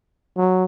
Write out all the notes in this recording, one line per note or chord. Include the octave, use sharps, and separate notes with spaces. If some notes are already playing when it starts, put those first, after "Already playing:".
F#3